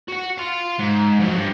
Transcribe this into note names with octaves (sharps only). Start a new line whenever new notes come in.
F#4 F#5
F5 C6
G#2
F2 F#3
G2